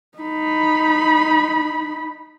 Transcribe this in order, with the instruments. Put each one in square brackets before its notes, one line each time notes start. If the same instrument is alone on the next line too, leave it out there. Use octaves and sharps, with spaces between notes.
[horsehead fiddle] D#4 B5